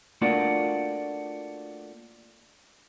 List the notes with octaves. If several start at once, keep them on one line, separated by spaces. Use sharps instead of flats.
A3 A#3 D4 F4 F#4